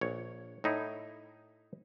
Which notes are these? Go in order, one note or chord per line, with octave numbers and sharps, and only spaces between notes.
A#1 C#5
A2 D#4 E4